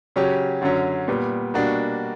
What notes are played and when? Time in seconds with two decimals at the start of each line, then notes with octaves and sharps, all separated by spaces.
0.16 C#3 F#3 C#4 G4
0.61 F#2 D3 F#3 C#4
1.08 A#2 G3 B3
1.54 B2 G3 A#3 D4 F#4